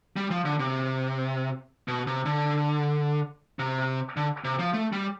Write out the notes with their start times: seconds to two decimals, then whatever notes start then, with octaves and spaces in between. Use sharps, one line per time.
0.16 G3
0.30 F3
0.45 D3
0.59 C3
1.88 B2
2.07 C3
2.26 D3
3.59 C3
4.17 D3
4.45 C3
4.59 F3
4.73 A3
4.93 G3